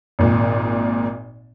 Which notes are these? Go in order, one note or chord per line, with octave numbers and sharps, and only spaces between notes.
G#1 A#2